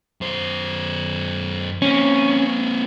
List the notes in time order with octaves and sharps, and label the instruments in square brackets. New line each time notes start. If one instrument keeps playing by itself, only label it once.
[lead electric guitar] F#2 C5
[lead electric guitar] A#3 C4 [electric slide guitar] C#4